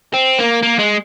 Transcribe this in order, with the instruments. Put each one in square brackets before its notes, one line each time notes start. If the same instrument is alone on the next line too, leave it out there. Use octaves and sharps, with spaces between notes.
[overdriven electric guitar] C4
A#3
A#3
G#3